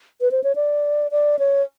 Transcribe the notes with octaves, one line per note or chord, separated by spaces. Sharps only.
B4
C5
C#5
D5
D5
C#5